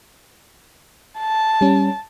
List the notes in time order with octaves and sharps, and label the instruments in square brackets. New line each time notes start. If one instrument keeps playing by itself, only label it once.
[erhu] A5
[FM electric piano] G3 C#4